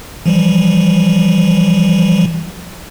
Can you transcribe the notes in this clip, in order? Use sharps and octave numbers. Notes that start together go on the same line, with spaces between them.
E3 F3 G3